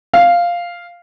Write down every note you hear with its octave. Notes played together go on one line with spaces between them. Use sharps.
F5